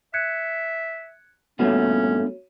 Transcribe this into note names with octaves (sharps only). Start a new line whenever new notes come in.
E5 F#6 G#6 C#7
G2 A#2 A3 B3 C#4 F#4 C#5